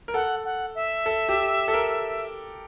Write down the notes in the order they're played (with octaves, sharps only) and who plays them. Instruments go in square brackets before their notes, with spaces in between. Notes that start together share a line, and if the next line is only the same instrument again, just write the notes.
[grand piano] A#4
[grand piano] A4 [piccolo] F#5
[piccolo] F#5
E5
[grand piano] A4
G4
A4
A#4